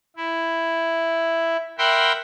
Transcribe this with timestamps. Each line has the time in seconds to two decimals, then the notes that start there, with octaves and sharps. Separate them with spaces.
0.16 E4
1.78 A#4 E5 F#5 G5 B5 C6